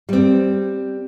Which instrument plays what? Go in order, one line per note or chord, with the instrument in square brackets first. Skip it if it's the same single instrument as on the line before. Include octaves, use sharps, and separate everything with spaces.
[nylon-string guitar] G3 C4